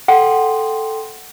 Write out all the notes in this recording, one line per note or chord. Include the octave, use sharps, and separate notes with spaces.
A4 F#5 G5 C6